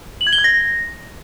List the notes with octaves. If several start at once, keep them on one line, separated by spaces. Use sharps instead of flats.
F#7
G#6
G7
G#6
A#6